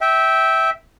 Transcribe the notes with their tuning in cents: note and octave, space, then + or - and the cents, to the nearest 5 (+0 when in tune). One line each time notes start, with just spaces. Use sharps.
E5 -15 G5 -10